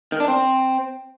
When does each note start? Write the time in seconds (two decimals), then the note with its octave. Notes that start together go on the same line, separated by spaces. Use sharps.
0.12 D#3
0.20 D4
0.28 C4